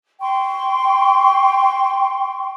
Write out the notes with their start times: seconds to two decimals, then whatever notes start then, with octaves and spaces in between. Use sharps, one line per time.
0.21 G5 C6 C#6